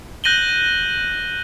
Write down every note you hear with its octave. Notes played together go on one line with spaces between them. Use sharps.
F#6 G6 A#6 D#7 F#7 G7